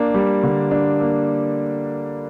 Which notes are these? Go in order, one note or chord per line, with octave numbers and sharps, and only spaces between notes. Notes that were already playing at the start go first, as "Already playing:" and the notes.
Already playing: A#3 D4
G3
D3
D4
A#3